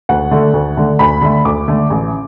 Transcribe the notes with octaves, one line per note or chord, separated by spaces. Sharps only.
D2 F#5
D3 A3
D2
D3 A3
D2 B5
D3 A3
D2 D6
D3 A3
A1